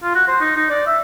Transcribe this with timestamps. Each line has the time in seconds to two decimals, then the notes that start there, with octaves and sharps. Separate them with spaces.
0.03 F4
0.15 F#4
0.28 C5
0.41 D#4
0.56 D#4
0.70 D5
0.87 E5